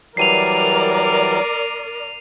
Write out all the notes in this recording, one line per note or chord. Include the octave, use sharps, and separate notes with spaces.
E3 F#3 G3 A#4 D5 C7 D#7 F7